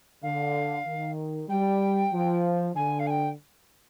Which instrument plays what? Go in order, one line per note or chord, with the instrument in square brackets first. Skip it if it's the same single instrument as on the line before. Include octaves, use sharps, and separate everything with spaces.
[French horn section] D3 [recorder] F5
[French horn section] D#3
[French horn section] G3 [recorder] G5
[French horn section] F3
[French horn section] D3 [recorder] G#5
[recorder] F5
G#5
G5